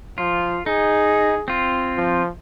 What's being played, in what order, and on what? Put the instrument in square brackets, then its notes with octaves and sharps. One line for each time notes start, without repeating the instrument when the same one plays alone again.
[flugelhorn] F3 [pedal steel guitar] F4
[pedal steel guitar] D#4 [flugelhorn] G#4
[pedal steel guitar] C4 F4
[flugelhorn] F3